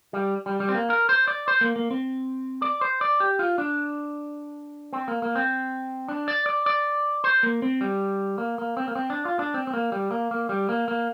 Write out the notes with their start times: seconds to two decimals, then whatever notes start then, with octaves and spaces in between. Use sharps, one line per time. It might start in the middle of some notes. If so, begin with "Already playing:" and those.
0.13 G3
0.46 G3
0.60 G3
0.69 C4
0.75 A#3
0.90 A#4
1.09 C5
1.27 D5
1.48 C5
1.61 A#3
1.76 A#3
1.91 C4
2.62 D5
2.81 C5
3.01 D5
3.20 G4
3.39 F4
3.58 D4
4.93 C4
5.08 A#3
5.22 A#3
5.35 C4
6.09 D4
6.28 D5
6.46 D5
6.66 D5
7.24 C5
7.43 A#3
7.62 C4
7.81 G3
8.38 A#3
8.58 A#3
8.77 C4
8.88 A#3
8.96 C4
9.10 D4
9.25 F4
9.39 D4
9.54 C4
9.67 C4
9.74 A#3
9.92 G3
10.11 A#3
10.31 A#3
10.49 G3
10.69 A#3
10.88 A#3